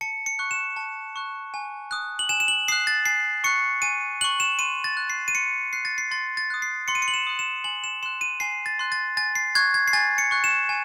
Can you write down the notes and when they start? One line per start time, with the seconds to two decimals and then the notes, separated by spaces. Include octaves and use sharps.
0.01 A5 C#7
0.26 C#7
0.39 C#6 F#6
0.51 E7
0.76 A5
1.16 C#6 F#6
1.54 G#5
1.91 D#6 F#6
2.19 F#7
2.29 G#5 E7
2.40 E7
2.48 F#7
2.68 D#6 F#6 C7
2.87 A6
3.06 G#5 C7
3.44 C#6 F#6 C#7
3.82 G#5 D#7
4.21 C#6 F#6 F#7
4.40 E7
4.59 C6 D#7
4.84 A6
4.97 F#6
5.10 C7
5.28 D#7
5.35 C6 C#7
5.73 F#6 C7
5.85 A6
5.98 C7
6.11 C6 A6
6.37 A6
6.50 D#6 F#6
6.62 C7
6.88 C6 C#7
6.95 D#7
7.02 C#7
7.08 F#7
7.14 E7
7.27 D#6 F#6
7.39 E7
7.64 G#5 F#7
7.84 E7
8.03 C6 F#6 E7
8.21 D#7
8.40 G#5 C7
8.66 A6
8.79 C6 F#6
8.92 A6
9.17 G#5 A6
9.35 C7
9.55 C#6 F#6 G#6
9.74 G#6
9.88 C7
9.93 G#5 A6
10.18 C#7
10.31 C#6 F#6
10.44 E7
10.69 G#5